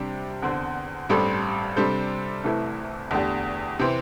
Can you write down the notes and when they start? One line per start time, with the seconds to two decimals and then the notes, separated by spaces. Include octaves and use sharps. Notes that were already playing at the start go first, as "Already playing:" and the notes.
Already playing: C3 G3 D4 G4
0.43 E2 D3 C4
1.09 A1 G2 G3 C4 A4
1.76 C3 G3 D4 A4 C5
2.44 C2 C3 E3 A3 E4
3.11 E2 D3 A3 D4 G4
3.79 C3 E3 C4